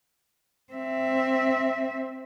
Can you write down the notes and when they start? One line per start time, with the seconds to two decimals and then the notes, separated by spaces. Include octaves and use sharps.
0.73 C4 E5